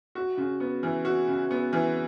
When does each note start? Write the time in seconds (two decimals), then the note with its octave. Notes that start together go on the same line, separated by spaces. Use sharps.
0.15 F#4
0.37 C#3
0.60 B3
0.83 E3
1.05 F#4
1.27 C#3
1.51 B3
1.73 E3